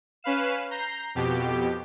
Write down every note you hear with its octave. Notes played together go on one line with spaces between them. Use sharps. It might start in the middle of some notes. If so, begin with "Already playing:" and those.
C#4 B4 F5 E7
A#5 G6 C7
F2 B2 G4